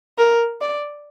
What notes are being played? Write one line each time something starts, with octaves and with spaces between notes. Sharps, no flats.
A#4
D5